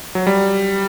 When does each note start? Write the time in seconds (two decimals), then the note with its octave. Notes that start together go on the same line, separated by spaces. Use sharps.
0.15 F#3
0.27 G3